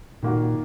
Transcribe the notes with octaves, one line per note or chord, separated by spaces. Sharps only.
A#2 D#3 A#3 F#4